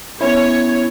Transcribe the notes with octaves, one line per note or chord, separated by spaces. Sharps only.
B3 C#4 E4 C#5